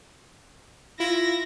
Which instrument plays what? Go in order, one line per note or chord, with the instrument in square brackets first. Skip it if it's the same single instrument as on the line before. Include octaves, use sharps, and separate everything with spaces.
[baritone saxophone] E4 [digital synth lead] F4 [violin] A#6